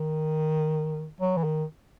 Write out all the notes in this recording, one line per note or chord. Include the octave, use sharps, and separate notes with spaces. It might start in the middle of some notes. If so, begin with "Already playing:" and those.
Already playing: D#3
F#3
E3
D#3